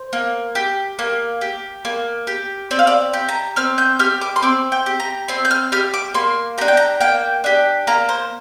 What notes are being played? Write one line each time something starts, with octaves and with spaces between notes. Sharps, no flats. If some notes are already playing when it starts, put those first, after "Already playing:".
Already playing: C5
A#3
G4
A#3
G4
A#3
G4
C4 D5
F5
D5
G4
A#5
C4 F6
G6
G4 F6
D6
C6
C4 D6
G5
G4
A#5
C4 C6
G6
F6
G4 F6
D6
A#3 C6
D4 G4 A#5
G5
A#5
A#3 G5
D4 G4
A#3 A#5
C5